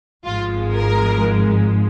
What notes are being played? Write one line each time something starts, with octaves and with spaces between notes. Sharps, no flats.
G#1 G#2 F3 G#3 F4
A#4